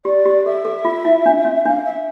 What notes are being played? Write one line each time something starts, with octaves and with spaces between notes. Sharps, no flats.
G4 D5
G4
A4 E5
A4
F4
E4
D4
C#4
D4 F5
E5